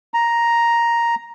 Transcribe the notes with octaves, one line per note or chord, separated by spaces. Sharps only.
A#5